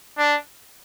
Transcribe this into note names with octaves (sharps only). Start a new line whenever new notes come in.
D4